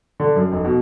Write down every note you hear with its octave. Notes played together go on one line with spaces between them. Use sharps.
D3
F#2
F1
B2